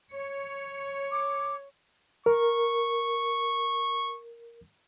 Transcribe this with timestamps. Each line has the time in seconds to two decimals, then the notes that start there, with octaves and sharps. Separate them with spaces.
0.13 C#5
1.11 D6
2.26 A#4 C#6